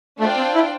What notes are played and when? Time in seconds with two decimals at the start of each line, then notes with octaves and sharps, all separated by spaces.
0.20 A3 D4 F4 C5 G5
0.37 C4
0.55 E4